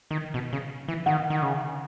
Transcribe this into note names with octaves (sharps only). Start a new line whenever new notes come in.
D#3
B2
C#3
E3
D#3 F#5
D#3
C#3